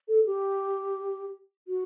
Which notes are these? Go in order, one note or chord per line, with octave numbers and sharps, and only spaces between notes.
A4
G4
F#4